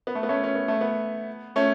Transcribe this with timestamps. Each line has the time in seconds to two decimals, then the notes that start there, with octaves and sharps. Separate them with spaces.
0.07 B3
0.15 A3
0.23 B3
0.29 A3 C#4
0.43 C#4
0.55 B3
0.68 A3
0.81 B3
1.56 A3 C#4